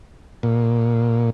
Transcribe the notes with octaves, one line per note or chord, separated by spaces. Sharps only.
A#2